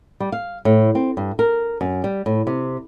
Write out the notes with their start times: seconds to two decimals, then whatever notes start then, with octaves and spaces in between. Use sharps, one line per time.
0.20 G3
0.32 F5
0.65 A2
0.95 C4
1.17 G2
1.39 A#4
1.81 F#2
2.04 G3
2.26 A2
2.47 C3